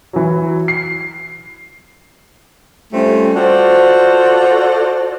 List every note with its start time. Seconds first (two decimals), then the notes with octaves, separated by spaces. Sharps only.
0.13 E3 F#3
0.68 C7
2.93 G3 A3 C4 C#4 F4
3.36 F4 F#4 A4 C5 D5